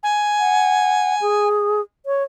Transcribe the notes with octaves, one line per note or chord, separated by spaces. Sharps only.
G#5
F#5
G#4
C#5